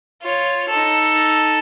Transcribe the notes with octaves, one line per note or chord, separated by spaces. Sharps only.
F4 C#5
D#4 A4